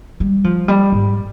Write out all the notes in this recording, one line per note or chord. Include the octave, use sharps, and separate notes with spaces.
G3
F3
G3
G#2